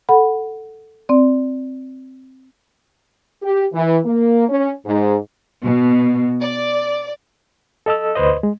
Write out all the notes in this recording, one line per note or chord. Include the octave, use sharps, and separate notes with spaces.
A4 F#5 B5
C4 D5
G4
E3
A#3
C#4
G#2
B2
D5
A4 D#5 A5 E6
D2 B4 C5 D#5
G#3